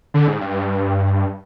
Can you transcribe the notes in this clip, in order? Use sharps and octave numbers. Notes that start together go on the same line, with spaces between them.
D3
G#2
G2